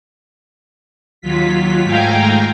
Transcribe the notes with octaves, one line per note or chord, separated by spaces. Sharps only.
D#2 F#3 F4 B6
G#2 A3 F5 G5 G#5 A#5